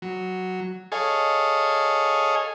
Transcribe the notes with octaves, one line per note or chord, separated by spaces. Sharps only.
F#3
G#4 A4 C#5 D#5 F5 G#5